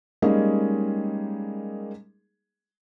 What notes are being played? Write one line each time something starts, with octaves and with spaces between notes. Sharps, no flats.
G3 G#3 A#3 C#4 D#4 G#4